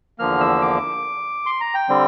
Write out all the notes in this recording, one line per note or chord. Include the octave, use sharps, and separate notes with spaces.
E2 D3 F3 A#3 F6
E6
D6
C6
A#5
G5
D3 G3 C4